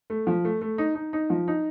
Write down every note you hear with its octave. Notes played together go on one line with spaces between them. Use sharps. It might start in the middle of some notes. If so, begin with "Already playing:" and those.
A3
F3
A3
A3
D#4
D#4
D#4
F3
D#4